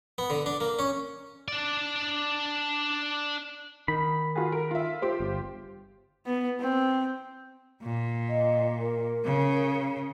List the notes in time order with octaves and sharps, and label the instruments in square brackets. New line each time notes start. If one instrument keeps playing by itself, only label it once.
[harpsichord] B3
D3
D4
A#3
C#4
[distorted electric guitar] D4 D5
[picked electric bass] D#3 [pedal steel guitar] B5
[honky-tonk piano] F4 F#4 G#4
A#4
F4 E5
F4 G4 C5
[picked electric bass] G1
[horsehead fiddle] B3
C4
[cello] A#2
[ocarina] D#5
A#4
[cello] C#3